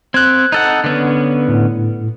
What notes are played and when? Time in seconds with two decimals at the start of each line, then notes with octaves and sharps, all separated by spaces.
0.14 C4 F#6 G#6
0.52 D#4 A4 F#5
0.84 D3 B3 C#4
1.48 A2